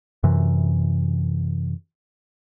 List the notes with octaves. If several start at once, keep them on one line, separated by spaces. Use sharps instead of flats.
F#2 C3 E3